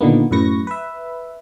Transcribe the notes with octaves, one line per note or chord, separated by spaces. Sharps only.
A#2 D3 D#3 A#3 B3
F#2 A2 B4 C#6 A#6
B4 E5